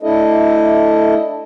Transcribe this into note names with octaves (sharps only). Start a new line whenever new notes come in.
A3 D4 E4 A4 D#5